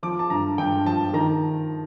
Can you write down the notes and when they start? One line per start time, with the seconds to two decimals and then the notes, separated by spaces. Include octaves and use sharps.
0.03 F3 D6
0.19 A5
0.30 G2 A#5
0.58 G2 G5
0.86 F3 A5
1.13 D#3 A#5